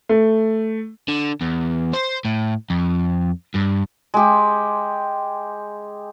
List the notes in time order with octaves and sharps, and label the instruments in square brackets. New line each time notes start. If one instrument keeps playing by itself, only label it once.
[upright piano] A3
[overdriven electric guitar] D3
E2
C5
A2
F2
G2
[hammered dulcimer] G#3 G4